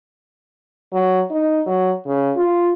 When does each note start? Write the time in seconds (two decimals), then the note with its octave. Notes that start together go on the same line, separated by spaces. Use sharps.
0.93 F#3
1.31 D#4
1.66 F#3
2.07 C#3
2.36 F4